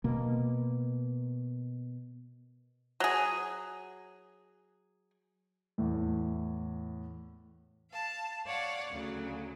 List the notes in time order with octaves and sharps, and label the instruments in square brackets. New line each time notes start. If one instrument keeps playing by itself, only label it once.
[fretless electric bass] B2 A#3
[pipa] F#3 G#4
[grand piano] E2 A2
[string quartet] F5 A5
C#5 D5 F5 F#5
D2 C#3 F#3